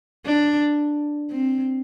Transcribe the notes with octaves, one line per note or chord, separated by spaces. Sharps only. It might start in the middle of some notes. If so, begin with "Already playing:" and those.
D4
C4